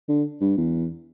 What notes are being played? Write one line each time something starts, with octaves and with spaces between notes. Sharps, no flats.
D3
G2
E2